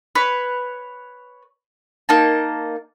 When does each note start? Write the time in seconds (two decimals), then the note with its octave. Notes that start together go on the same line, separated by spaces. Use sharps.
0.15 B4 C#5
2.09 A#3 D#4 A5